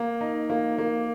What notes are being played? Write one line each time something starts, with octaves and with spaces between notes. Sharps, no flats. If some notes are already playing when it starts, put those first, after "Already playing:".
Already playing: A#3
D#4
A#3
A#3